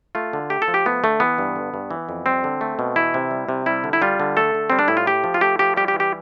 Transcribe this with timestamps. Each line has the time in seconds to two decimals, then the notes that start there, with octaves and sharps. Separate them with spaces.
0.15 A3 F4
0.33 D3
0.50 A3 G4
0.62 A4
0.68 F3
0.74 G4
0.86 A3 B3
1.04 D3 A3
1.20 E3 B3
1.38 G2
1.56 D3
1.74 G2
1.91 E3
2.09 F2
2.26 G3 C4
2.44 D3
2.61 A3
2.79 B2
2.96 E3 E4
3.14 C3
3.31 G3
3.49 C3
3.66 G3 E4
3.84 D3
3.93 E4
4.02 G3 F4
4.20 D3
4.37 A3 A4
4.55 D3
4.70 G3 C4
4.79 D4
4.88 A2 E4
4.97 F4
5.07 A3 G4
5.24 F3
5.34 F4
5.41 A3 G4
5.59 F3 G4
5.77 G3 G4
5.88 G4
5.94 E3
6.00 G4